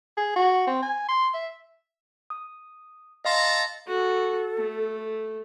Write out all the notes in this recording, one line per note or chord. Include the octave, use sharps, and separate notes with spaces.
G#4
F#4
C4
G#5
C6
E5
D#6
A4 D#5 F5 A5 A#5 C6
F#4 A4
A3